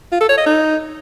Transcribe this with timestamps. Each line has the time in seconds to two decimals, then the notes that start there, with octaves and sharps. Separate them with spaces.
0.12 F4
0.21 A4
0.29 C#5
0.38 D#5
0.46 D#4